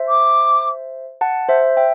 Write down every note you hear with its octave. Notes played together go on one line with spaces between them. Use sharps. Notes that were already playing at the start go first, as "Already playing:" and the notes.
Already playing: C5 E5
D6
F#5 A5
C5 E5
E5 G5